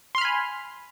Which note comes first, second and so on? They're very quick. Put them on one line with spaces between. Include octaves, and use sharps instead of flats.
C6 F6 B5 G#5